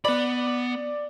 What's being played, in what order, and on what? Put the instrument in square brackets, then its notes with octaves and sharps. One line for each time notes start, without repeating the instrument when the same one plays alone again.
[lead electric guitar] B3 B5 [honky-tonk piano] D5